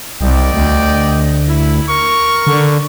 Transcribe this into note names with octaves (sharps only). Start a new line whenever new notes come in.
C2 D5 D#5 G5
D2
E4
A#4 C#6
D3